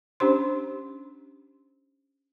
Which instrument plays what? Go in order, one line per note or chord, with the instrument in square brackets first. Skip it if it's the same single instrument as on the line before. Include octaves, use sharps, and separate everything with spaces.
[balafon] C#4 D4 G4 C5 C6